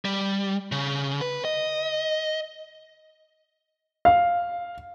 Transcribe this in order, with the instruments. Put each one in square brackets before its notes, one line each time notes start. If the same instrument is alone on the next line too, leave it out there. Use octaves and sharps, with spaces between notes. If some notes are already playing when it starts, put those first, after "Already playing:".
[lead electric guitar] G3
C#3
B4
D#5
[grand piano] F5